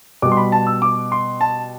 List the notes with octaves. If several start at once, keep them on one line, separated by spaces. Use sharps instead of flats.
B2 G3 D6
C6
B5
A5
E6
D6
C6
A5